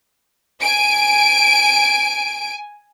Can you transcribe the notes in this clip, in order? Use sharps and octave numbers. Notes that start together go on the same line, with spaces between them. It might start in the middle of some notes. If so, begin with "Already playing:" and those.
G#5 D7